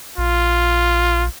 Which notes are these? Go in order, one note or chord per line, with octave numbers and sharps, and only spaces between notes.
A#1 F4